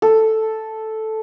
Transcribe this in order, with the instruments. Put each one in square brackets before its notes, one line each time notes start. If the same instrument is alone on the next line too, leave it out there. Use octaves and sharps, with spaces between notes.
[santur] A4